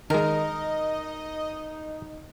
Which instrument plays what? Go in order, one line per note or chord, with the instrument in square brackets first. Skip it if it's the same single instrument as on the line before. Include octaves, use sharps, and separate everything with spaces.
[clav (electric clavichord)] D#3 G#3 [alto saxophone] D#4 [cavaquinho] A#4 [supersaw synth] D#5